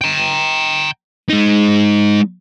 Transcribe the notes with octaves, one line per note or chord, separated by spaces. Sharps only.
G5 A#5
G#3 D#4